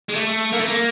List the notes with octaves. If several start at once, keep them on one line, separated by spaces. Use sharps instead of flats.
G#3
A3
A#3
A3
A#3